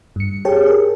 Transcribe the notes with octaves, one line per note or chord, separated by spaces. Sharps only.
G2 C#7
G4 G#4 C#5 G5 A5
G#4 A#4